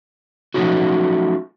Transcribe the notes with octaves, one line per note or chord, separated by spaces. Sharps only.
F3 F#3 A3 C#4 D#4 F#4